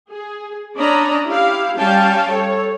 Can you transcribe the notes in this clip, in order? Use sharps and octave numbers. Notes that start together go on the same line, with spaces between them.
G#4
C#4 D4 D5 D#5 A#5 B5
E4 G4 F5
G3 C#4 F5 G5 A5
A4 C#5